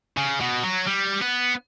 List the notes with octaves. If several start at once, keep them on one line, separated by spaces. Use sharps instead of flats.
C#3
B2
F#3
G3
B3